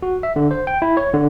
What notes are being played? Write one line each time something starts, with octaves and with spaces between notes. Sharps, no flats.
F#4
E5
D3
C5
G5
E4
C#5
D3